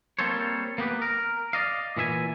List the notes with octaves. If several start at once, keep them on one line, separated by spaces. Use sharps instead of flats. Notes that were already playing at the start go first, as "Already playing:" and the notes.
G3 A#3 C4 A4 C5 C#5
A#3 B3 G4 B4
A#4
D5 D#5 F5
A#2 E3 E5 G#5